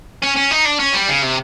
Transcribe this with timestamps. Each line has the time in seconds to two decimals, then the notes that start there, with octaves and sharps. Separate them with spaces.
0.22 C#4
0.36 C#4
0.51 D#4
0.65 D4
0.79 C#4
0.94 G3
1.08 C#3
1.22 C3